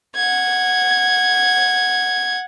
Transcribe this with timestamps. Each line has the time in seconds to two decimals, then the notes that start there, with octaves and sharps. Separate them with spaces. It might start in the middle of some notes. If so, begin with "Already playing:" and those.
0.16 F#5 G#6